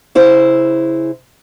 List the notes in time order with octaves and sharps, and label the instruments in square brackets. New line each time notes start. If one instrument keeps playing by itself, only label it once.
[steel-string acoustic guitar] C#3 E4 C5